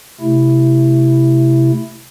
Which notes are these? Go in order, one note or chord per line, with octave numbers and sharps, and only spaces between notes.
C3 A3 E4